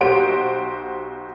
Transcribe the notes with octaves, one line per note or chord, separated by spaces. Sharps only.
B1 F#4 G4 C5 D7